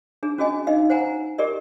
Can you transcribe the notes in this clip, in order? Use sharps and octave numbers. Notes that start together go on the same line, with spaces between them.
D4 G#4
C#4 F#4 G#4 D#5 G#5
D#4 D#5 F5
C5 F#5 G#5 A#5
G4 G#4 A#4 D5 D#5